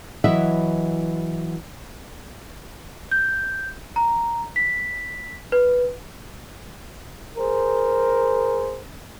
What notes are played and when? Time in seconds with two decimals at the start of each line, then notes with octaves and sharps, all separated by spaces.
0.24 E3 F#3 E4 B4 D#5 E5
3.11 G6
3.96 A#5
4.56 B6
5.52 B4
7.37 G#4 A#4 C5